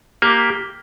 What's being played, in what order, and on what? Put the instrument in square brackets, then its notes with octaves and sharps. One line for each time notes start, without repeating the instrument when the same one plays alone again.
[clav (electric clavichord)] A#3 [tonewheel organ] G4